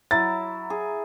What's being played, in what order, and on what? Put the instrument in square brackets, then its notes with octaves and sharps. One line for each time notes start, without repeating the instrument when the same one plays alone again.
[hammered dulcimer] F#3 E4 A#5 [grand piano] A6
[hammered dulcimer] G#4